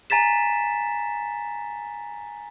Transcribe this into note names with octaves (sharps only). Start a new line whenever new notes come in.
G#5 A#5 A6 B6 E7